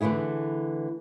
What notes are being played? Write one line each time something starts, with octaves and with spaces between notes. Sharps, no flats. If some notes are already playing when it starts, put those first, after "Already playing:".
D3 E3 A3 E4 G#4